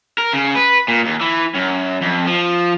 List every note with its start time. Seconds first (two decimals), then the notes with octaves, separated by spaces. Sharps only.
0.18 A#4
0.34 C#3
0.56 B4
0.88 A#2
1.06 D#2
1.21 E3
1.54 F#2
2.01 F2
2.26 F3